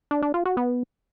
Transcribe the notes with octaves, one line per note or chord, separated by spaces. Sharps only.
D4
D4
F4
F#4
B3